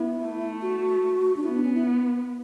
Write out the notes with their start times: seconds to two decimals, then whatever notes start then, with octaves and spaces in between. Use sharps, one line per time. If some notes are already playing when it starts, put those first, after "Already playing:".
Already playing: B3 E4
0.21 A3
0.62 F#4
1.36 D4
1.43 B3 E4
1.53 D4
1.64 C#4
1.74 E4